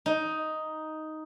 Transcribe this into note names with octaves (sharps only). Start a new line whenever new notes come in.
D#4